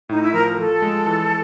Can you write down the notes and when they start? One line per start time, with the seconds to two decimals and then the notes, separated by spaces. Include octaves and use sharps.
0.09 A2 D#4
0.22 E4
0.34 F3 A#4
0.53 A#4
0.58 F3 A4
0.82 G#3
1.06 E3